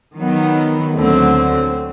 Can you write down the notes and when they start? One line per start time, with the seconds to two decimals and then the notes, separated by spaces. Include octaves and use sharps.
0.16 D#3 F#3 B3
0.93 D2 D3 F#3 A3 C4